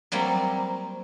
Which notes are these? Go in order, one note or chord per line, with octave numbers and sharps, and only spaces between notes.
F#3 G3 A#3 C4